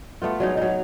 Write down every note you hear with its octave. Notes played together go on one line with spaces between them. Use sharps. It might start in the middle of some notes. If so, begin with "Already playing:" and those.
A3 B3 F4
F#3 G#3 D#4
F#3 D#4